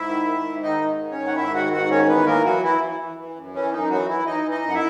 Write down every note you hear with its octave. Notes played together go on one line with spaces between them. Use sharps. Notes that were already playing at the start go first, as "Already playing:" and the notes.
Already playing: G#2 E4 E5
D#3
D#3
G#2
D#3 D#4 D#5
G#2
D#3
C#4 C#5
G#2
F#5
G#2 E4 E5
D#3 F#4 F#5
G#2 F#4 F#5
D#3 C#4 C#5
E3 B3 B4
E3 A#3 A#4
E3 F#3 F#4
E3 E4
E3
E3
E3
F#2
E3 C#4
F#2 D#4
E3 F#3 F#4
E3 E4
E3 D#4 D#5
E3
D#4 D#5
F#2
F#5
E4 E5